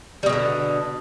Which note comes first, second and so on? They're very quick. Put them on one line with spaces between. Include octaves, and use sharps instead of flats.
G3 B2 G#3 D3